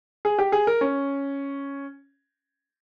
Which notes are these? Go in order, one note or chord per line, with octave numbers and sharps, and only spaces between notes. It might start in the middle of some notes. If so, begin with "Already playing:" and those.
G#4
G4
G#4
A#4
C#4